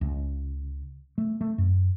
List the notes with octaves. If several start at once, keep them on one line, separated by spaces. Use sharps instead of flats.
C#2
A3
A3
F#2